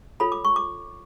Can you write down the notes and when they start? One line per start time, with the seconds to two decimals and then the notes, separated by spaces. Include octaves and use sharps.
0.20 F4 A4 C#5 B5
0.32 D6
0.45 C#6
0.56 D6